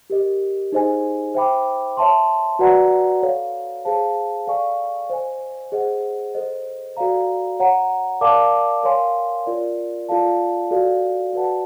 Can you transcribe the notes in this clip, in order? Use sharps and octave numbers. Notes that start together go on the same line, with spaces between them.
G4 A#4 D#5
D#4 G#4 C5 D#5 G#5
C5 E5 G5 B5 D6
C#5 E5 A5 C6
F#4 B4 D5 F#5 A#5
A4 C#5 F5
G#4 C5 F5 A5
A4 D5 F5 G#5 C#6
C5 D#5 G#5
G#4 C5 D#5 F#5
A4 C5 D#5
F#4 A4 D5 F5 A#5
C#5 F#5 A#5
A#4 D5 F5 A5 D6
A#4 C#5 F5 G#5 C6
F4 A#4 D5
F4 A4 D5 F5 A5
F#4 A4 D5 F5
F#4 B4 D5 F#5 A5